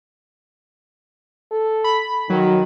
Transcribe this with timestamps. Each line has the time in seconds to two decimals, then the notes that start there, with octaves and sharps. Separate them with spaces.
1.52 A4
1.84 B5
2.30 D#3 F#3